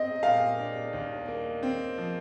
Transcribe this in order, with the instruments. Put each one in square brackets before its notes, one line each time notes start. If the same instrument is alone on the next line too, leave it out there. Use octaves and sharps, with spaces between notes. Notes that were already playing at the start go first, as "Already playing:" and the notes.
Already playing: [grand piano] C4 [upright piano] D#5
[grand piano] A#2 [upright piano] F5
[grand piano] D4
D#2
A#3
C4
F3